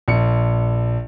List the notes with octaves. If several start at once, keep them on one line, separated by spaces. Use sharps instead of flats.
A#1 C#7